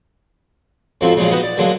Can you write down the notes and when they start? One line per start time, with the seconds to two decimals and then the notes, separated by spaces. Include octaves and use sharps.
1.01 F2 G#2 F3 F#3 C4
1.16 A#2 C#3 F3 F#3 G#3
1.31 B3 D#4 F#4 G4 B4
1.43 D5
1.57 D3 F#3 G#3 A#3